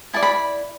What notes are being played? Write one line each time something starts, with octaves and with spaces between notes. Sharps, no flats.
E4 D5 A5
B5